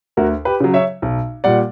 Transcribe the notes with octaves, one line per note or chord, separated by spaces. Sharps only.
D2 F#4 A#4
G4 B4
C#3 F#3
C#5 E5
B1
A#2 G3 D5 F#5